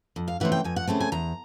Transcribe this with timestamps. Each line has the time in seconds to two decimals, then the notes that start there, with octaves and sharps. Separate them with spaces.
0.16 F2
0.28 F5
0.40 C#3 E3 A3 C4 F#5
0.52 G5
0.64 F2 G#5
0.76 F#5
0.87 C#3 E3 A3 C4 A5
1.00 G#5
1.12 E2 A#5